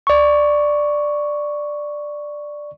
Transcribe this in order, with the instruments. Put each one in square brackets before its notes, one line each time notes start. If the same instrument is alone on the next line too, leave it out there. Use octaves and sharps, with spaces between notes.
[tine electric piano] D5 C#6